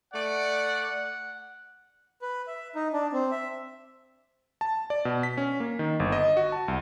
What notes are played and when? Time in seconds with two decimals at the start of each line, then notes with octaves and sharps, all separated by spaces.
0.14 A3 D5 F#5
2.22 B4
2.47 E5
2.75 D#4
2.93 D4
3.13 C4
3.32 E5
4.61 A5
4.90 D5
5.05 B2
5.23 B6
5.37 C#4
5.60 A#3
5.79 D#3
6.00 G1
6.12 D#5
6.37 F#4
6.52 A5
6.68 C2